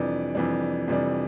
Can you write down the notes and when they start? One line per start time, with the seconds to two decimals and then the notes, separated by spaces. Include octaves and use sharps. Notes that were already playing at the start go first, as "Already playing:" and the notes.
Already playing: F2 C3 E3 G3 D4
0.35 F2 C3 E3 G3 D4
0.88 F2 C3 E3 G3 D4